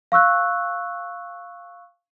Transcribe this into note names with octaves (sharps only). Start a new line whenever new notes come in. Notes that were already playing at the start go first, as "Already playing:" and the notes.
F5 C#6 E6 F#6